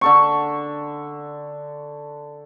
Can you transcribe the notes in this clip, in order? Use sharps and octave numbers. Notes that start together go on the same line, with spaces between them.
D3 A4 C#6